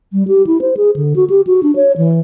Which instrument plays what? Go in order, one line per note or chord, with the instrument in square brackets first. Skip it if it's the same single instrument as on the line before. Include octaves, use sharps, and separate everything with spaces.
[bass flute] G3
G4
E4
C5
G#4
D3
F#4
G4
F#4
D4
C#5
E3